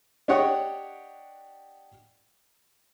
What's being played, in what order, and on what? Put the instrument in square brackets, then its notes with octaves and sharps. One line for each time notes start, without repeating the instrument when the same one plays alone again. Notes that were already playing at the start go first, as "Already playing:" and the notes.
[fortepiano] D4 G4 C#5 D#5 F#5